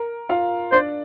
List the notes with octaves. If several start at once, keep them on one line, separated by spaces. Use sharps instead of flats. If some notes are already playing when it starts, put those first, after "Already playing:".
Already playing: A#4
F4 F5
D4 C5 D5